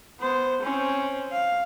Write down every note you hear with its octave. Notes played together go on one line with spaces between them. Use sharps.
B3 C5
C4 C#4
F5